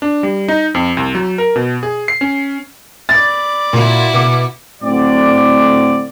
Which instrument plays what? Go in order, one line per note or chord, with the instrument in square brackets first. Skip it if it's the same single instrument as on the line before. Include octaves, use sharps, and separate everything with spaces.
[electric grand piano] D4
G3
D#4
F2
C2
F#3
A#4
B2
G#4
C7
C#4
[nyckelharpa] D5 B5 [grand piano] A6
[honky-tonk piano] A#2 [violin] E4 F#4
[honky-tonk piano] B2 D6
[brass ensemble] A2 D3 F#3 C4 D5